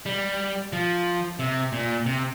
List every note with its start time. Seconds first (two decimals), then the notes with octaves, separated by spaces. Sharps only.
0.06 G3
0.73 F3
1.39 C3
1.72 A#2
2.06 C3